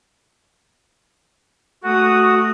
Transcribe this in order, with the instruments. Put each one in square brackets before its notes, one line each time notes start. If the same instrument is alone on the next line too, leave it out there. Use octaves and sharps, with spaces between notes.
[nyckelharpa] A3 D#6 [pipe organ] F#4